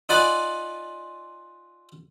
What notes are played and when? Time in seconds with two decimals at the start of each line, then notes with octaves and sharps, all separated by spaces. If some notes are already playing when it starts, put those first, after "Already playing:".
0.09 D#4 F4 D5 F#5 G#5 B5